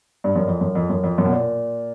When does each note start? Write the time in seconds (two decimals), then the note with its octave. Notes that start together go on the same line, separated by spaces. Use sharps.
0.24 G2
0.36 F#2
0.47 F2
0.61 F#2
0.75 F2
0.90 F#2
1.04 F2
1.18 F#2
1.25 B2
1.32 A#2